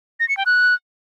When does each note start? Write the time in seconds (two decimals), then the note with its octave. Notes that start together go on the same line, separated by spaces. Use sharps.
0.20 A#6
0.29 C#7
0.37 G5
0.46 F#6